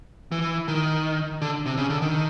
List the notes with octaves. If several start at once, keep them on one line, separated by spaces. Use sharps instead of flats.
E3
D#3
D3
C3
C#3
D3
D#3